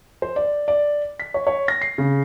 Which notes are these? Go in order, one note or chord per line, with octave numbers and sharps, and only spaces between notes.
C5
D5
D5
B6
C#5
C#5
A#6
C7
C#3